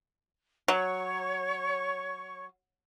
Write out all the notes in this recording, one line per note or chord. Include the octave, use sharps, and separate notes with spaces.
F#3 C#5 C#6